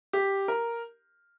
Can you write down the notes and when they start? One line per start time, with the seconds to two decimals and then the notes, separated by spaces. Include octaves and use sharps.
0.13 G4
0.48 A#4